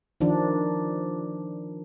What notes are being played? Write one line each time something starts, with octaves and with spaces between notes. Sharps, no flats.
D#3 F3 D4